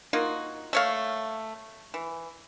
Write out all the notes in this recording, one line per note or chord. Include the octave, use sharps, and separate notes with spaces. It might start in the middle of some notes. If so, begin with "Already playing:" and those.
A#3 D#4 F4 F#4
A3 C#5 F5
E3